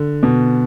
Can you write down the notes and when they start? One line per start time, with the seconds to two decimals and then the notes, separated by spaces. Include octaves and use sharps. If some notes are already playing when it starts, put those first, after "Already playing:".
Already playing: D3
0.23 B2